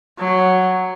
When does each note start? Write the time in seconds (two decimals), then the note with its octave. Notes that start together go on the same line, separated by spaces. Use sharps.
0.18 F#3